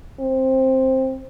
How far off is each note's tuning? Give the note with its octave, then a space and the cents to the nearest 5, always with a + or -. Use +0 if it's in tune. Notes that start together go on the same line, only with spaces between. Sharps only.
C4 +10